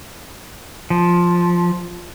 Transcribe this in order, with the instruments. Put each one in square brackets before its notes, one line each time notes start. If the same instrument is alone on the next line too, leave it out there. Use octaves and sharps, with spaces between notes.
[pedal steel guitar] F3